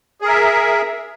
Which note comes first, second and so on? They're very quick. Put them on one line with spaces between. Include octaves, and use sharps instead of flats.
G#4 A#4 E5